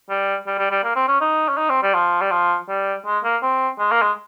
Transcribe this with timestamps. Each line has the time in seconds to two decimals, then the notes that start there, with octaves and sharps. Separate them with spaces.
0.09 G3
0.47 G3
0.59 G3
0.71 G3
0.84 A#3
0.96 C4
1.08 C#4
1.21 D#4
1.49 C#4
1.57 D#4
1.69 C4
1.83 G3
1.94 F3
2.21 G3
2.31 F3
2.68 G3
3.06 G#3
3.24 A#3
3.42 C4
3.79 G#3
3.92 A#3
4.02 G#3